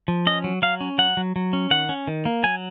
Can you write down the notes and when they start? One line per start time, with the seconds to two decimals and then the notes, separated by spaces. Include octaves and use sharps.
0.08 F3
0.27 C#4 D#5
0.44 F#3
0.62 F#3 F5
0.81 C#4
0.98 F#3 F#5
1.17 F#3
1.36 F#3
1.53 C#4
1.71 D#3 F#5
1.89 C#4
2.07 D#3
2.25 A#3
2.43 F#3 G#5